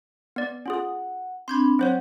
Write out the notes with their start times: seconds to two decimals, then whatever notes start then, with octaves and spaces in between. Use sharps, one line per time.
0.36 B3 D5
0.66 C#4 F4 G#4 F#5
1.48 C4 D4 B5 C6 G6 G#6
1.79 F#3 C4 C5 C#5 F#5